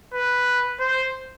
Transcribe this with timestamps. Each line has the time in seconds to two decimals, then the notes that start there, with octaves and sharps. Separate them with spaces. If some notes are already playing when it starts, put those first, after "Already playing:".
0.14 B4
0.80 C5